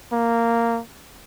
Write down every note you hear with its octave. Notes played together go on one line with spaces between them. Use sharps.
A#3